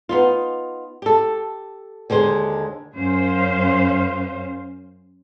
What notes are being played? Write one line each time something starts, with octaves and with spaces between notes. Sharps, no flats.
B3 D#4 F4
G4 A4
D#2 D3 G#3 C5
F#2 C#4 C5 F5